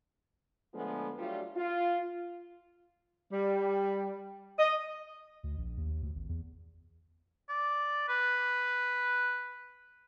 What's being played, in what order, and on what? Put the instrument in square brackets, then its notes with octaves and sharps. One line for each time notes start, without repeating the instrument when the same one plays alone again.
[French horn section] D3 F3 G#3 A3 B3
F#3 G3 A3 D4 F4
F4
[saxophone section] G3
D#5
[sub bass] D2
A#1
D#2
D2
G#1
E2
[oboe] D5
B4